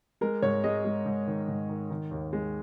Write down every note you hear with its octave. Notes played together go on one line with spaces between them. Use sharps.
G#3 A#4
G#2 C#5
G#3 D#5
G#3
G#2
D#3
G#2
D#3
D#3
D#2
G#3